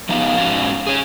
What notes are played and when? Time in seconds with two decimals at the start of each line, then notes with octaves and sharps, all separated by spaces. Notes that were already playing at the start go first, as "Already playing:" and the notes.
0.09 F3 B3 D#4 G4 F5
0.38 G#2 C#4 F#4 F5
0.87 G#4 C#5